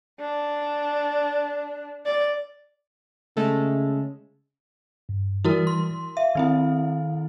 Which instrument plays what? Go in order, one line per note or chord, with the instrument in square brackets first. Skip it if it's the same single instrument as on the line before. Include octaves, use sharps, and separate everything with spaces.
[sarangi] D4
D5
[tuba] C#3 [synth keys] G#3 A3 A4
[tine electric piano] G2
[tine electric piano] E3 G3 [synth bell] E4 F#4 A#4
[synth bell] C6
[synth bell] E5 [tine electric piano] F5
[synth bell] D#3 C4 E4